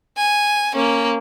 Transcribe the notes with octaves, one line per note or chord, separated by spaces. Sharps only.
G#5
A#3 C#4